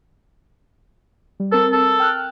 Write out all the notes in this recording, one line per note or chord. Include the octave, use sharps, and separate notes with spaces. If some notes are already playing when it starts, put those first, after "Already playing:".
G3
C4 A4 A#4
A4
G5 F6 F#6